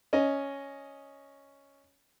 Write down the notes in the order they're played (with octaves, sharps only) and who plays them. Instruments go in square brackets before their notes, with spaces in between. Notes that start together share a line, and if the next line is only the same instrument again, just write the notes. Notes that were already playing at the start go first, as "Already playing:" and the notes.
[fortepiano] C#4 D#5